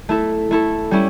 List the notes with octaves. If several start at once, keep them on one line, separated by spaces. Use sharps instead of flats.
A3 E4 A4
A3 E4 A4
G3 C#4 E4